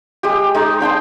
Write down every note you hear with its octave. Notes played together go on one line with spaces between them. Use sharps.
G#3 G4
G#3 D#4
D4 G5 A5 C6